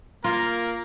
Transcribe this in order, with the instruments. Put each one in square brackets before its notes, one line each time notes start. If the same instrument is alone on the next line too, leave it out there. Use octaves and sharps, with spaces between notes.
[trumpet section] A#3 A#4 [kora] F4